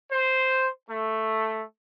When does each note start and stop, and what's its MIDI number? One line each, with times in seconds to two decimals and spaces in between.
0.12 0.68 72
0.90 1.62 57